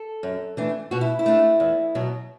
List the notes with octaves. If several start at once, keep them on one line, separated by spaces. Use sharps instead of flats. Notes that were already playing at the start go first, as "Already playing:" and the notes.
Already playing: A4
F#2
E3 A3 D4
B2 F#4
E4
E4
A3 D4
E2
B2 F#3